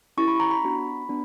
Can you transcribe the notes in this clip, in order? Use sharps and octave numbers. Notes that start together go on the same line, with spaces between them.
C#4 E4 G4 C#6
B5
A#5
B5
B3 D4 F#4
B3 D4